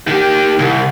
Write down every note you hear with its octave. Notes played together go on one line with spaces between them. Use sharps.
D#3 G4
C2